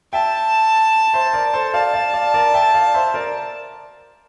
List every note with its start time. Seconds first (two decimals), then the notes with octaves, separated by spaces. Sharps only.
0.13 E5 G5 A5
1.14 C5 E5
1.34 A#4 D5
1.54 A4 C5
1.74 D5 F5 A5
1.94 D5 F5
2.13 D5 F5
2.34 A#4 D5
2.54 E5 G5
2.74 D5 F5
2.94 C5 E5
3.14 A#4 D5